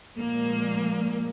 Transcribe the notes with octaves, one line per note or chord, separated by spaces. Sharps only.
A#2 F3 G#3 A#3